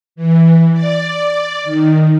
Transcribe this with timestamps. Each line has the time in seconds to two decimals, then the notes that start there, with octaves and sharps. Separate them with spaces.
0.16 E3
0.72 D5
1.64 D#3